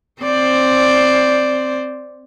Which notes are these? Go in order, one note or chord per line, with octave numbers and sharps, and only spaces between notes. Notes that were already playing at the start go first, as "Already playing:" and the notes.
C4 C5 D5